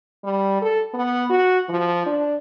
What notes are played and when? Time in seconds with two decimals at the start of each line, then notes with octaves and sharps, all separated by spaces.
0.24 G3
0.62 A4
0.94 B3
1.30 F#4
1.69 F3
2.06 D4